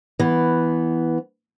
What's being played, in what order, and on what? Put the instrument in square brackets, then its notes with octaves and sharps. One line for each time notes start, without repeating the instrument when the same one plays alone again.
[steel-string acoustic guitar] E3 B3